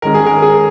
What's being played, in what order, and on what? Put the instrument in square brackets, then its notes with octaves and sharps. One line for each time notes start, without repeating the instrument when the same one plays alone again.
[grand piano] D#3 G#3 C#4 A#4
G#4
A#4
G#4